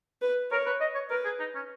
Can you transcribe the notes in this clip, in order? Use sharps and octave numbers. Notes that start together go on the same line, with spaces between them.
B4
A#4 C#5
B4
D#5
C#5
A#4 B4
G#4
D#4
C#4